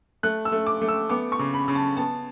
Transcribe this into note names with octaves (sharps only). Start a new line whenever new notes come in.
A3 F#6
E6
A3
D6
A3
E6
B3 D6
C#6
C#3
B5
C#3
A5
B3 A5